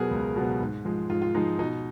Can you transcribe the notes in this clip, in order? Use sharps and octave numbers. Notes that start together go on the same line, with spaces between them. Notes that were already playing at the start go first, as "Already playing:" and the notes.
Already playing: B2 F#3 B3 G#4 A#4
C#2
B2 F#3 B3
G#2
F3 G#3
G#2 F4
F4
F3 G#3 D#4
B2 D#4